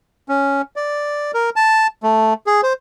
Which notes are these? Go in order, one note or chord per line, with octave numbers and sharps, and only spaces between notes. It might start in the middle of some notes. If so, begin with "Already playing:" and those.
C#4
D5
A#4
A5
A3
G#4
C5